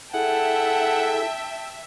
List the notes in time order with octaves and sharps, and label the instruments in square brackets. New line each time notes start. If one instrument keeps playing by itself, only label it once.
[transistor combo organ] E4 G#4 A4 [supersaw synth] E5 [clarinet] F#5 [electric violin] G5 A5